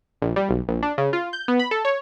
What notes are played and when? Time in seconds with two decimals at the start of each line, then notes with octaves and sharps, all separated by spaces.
0.22 A#1
0.36 G3
0.49 B1
0.68 A#1
0.83 D4
0.98 C#3
1.13 F4
1.33 G6
1.48 B3
1.59 B5
1.71 A4
1.85 C#5